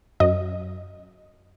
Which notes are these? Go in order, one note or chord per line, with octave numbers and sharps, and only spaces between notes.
F#2 F#3 D#5